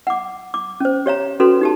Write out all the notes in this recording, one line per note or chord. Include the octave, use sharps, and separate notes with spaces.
F#5 D6
D6
C#4 C5
G4 C#5 F5 A#5
C#4 F#4 A4 B4 C6
D#4 G4 A5